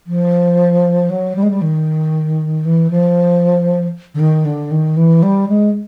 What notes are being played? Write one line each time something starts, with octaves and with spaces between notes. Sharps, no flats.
F3
F#3
G3
G#3
G3
D#3
E3
F3
D3
D#3
D3
D#3
E3
G3
G#3